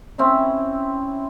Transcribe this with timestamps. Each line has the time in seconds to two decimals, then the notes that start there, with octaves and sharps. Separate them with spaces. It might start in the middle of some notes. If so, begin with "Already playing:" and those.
0.18 C4 C#4 E4 E5